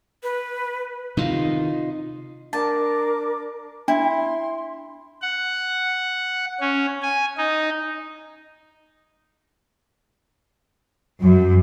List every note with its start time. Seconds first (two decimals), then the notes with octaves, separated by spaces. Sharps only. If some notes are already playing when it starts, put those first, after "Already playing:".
0.23 B4
1.17 C3 D#3 D#4 F4
2.53 D4 A#4 A5 D6
3.88 D4 E4 C6
5.22 F#5
6.60 C#4
7.02 G#5
7.38 D#4
11.22 F#2